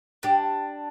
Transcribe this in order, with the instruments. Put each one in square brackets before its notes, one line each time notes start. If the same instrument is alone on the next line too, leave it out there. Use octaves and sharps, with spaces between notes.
[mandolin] D4 [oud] G4